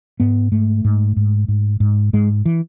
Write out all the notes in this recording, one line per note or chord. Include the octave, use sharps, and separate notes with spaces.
G#2 B3
G#2 A3
G#2
G#2
G#2
G#2
G#2 G#3
E3